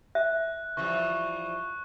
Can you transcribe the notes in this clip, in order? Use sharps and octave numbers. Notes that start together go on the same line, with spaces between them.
E5 F#6
E3 F3 G3 C#6